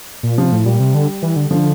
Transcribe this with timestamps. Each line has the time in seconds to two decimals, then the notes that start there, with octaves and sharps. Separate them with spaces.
0.23 A#2
0.38 C3 F3
0.52 A2
0.65 A#2 G3
0.80 C3
0.94 D3
1.22 E3
1.36 D3
1.50 D3 F3